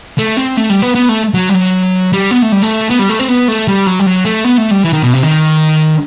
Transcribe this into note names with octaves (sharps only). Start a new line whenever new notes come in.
A3
C4
A3
G3
B3
B3
A3
F#3
G3
F#3
G3
B3
A3
G3
A3
B3
G3
A3
C4
B3
A3
G3
F#3
G3
F#3
A3
B3
A3
G3
E3
D#3
B2
C3
D#3